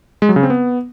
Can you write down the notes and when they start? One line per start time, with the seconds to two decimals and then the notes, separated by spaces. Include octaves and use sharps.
0.22 G#3
0.29 F#3
0.36 C#3
0.43 C4
0.50 B3